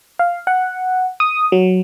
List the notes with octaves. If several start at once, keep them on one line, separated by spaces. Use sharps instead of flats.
F5
F#5
D#6
F#3